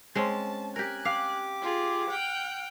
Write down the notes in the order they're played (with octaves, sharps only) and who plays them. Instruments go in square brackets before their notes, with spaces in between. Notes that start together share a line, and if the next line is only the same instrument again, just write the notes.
[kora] G#3 C4 C#4 [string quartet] A5
[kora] G4 A#4 [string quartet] G#5 F#6
[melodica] G4 D6 [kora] F5
[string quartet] F4 G#4
F#5 G5 F6